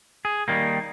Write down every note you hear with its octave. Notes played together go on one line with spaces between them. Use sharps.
G#4
D#3 G3 A#3